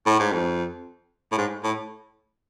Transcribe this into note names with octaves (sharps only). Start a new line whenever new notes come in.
A2
G#2
F2
A2
G#2
A2